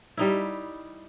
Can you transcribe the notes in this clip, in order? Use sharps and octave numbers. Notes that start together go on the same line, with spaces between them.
G3 D#4 E4